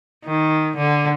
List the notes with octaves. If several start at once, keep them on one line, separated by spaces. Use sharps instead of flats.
D#3
D3